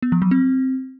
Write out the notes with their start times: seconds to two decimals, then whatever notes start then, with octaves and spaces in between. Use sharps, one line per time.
0.03 B3
0.12 F3
0.22 F#3
0.31 C4